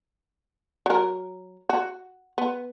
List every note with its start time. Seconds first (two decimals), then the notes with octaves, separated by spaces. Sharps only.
0.86 F#3 A#4
1.69 F#4
2.38 B3